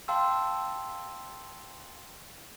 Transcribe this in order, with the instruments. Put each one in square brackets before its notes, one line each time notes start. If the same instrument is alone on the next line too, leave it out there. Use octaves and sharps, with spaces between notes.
[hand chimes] F5 G5 A5 C6 E6